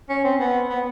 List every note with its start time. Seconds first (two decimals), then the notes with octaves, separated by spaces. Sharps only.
0.09 C#4
0.24 C4
0.40 B3
0.70 B3